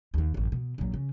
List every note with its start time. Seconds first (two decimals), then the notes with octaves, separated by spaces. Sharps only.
0.14 D#2 D#3
0.34 A1 F#2
0.52 B2
0.78 A#1 F#3
0.94 C#3